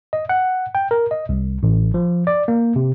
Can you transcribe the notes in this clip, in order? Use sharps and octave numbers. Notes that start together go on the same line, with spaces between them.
D#5
F#5
G5
A#4
D#5
C2
A1
F3
D5
A#3
C3